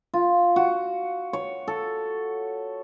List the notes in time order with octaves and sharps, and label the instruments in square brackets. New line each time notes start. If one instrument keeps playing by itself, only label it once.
[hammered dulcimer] F4
F#4
C#5
A4